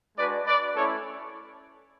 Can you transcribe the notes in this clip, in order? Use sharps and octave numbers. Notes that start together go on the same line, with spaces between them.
G#3 D4 F#4 B4 D5
B4 D5
A3 C#4 E4 A4 C#5